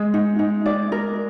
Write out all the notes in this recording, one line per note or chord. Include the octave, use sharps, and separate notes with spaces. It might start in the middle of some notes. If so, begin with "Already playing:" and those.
Already playing: G#3
D#4
D#4
D5
A#4